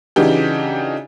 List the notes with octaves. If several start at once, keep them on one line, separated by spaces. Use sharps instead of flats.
C#3 E3 D4 D#4 F#4 G4